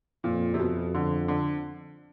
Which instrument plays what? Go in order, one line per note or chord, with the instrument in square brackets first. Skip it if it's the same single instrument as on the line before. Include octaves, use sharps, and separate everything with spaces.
[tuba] F2 [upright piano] A#2
[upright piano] C3
B2
D3
D3